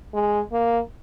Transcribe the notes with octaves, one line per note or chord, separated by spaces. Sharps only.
G#3
A#3